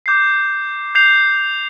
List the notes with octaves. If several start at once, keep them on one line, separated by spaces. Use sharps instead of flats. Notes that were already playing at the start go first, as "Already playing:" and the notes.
D6 G6 C7
G6 C7 F7